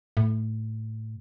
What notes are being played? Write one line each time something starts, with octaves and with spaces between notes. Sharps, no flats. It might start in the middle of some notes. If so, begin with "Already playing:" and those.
A2